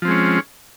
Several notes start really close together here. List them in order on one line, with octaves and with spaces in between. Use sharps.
F3 C4 G#3 C#4